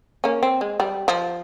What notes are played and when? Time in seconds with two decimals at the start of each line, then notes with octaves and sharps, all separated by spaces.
0.24 A#3 C#4
0.43 C4
0.61 G#3
0.80 G3
1.08 F3